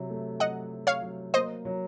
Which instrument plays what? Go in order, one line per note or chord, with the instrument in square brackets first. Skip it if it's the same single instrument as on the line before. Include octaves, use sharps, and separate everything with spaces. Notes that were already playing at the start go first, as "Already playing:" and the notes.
Already playing: [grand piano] C3 F#3
A3
[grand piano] F#3 [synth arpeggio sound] D#5 F#5
[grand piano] F#3
[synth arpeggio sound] C#5 F5
[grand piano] F#3
[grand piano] A#3 [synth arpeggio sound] C5 D#5
[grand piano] F#3